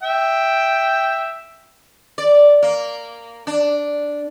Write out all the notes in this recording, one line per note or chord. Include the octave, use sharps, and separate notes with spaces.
E5 G5
D5
A#3
D4